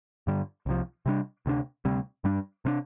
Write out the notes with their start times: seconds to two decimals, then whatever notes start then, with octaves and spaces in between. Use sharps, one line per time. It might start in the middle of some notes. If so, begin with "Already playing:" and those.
0.27 G2 D3 G3
0.66 C2 C3 F3
1.06 C3 G3 D4
1.46 D2 C3 A3 D4
1.85 D2 C3 G3 C4
2.24 G2 G3 D4
2.65 C3 G3 D4